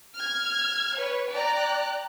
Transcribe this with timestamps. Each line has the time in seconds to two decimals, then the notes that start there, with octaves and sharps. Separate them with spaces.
0.16 F6 G#6
0.97 B4 C#5
1.32 D5 G5 A#5 F#6